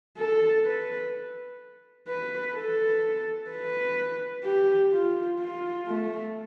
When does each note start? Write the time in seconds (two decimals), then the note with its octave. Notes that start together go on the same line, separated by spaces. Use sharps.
0.17 A4
0.65 B4
2.08 B4
2.55 A4
3.50 B4
4.44 G4
4.92 F4
5.39 F4
5.87 A3